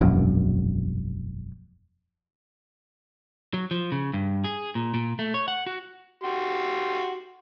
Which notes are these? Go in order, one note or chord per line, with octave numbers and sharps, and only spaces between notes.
E1 A#1 F#2
F#3
F3
C#3
G2
G#4
A#2
A#2
A3
C#5
F#5
F#4
F#4 G4 C6